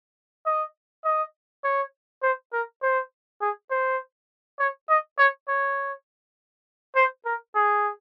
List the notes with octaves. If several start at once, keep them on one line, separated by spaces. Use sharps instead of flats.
D#5
D#5
C#5
C5
A#4
C5
G#4
C5
C#5
D#5
C#5
C#5
C5
A#4
G#4